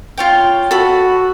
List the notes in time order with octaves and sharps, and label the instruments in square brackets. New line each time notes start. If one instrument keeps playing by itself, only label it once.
[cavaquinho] F4 C#5 G5
[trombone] F#4 [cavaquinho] A4 B5